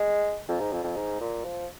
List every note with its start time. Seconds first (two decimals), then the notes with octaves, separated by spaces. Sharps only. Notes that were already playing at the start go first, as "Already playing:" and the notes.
Already playing: G#3
0.48 F2
0.60 G#2
0.72 F2
0.84 F2
0.96 G#2
1.21 A#2
1.44 F3